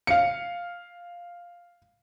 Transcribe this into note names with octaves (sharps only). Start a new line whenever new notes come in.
F5 C#7